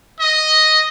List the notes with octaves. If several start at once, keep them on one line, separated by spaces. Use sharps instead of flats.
D#5